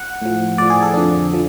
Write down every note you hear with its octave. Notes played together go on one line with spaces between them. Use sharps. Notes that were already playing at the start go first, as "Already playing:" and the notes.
Already playing: F#5
A2 F3
A2 F3 D5
G#4
A4
F2 D3 F3 D4
D3 F3